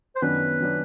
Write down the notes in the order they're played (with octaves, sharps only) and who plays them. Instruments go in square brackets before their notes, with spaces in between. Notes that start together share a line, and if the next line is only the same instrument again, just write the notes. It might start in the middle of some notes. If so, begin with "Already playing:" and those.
[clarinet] C5
[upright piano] F#2 D#3 F#3 B3 D4 [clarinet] B4
[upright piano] D#3 F#3 B3 D4